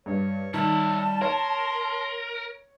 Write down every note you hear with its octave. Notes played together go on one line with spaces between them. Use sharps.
G2 C#5
D#3 G3 C#5 E5 A5
A#4 C#5 C6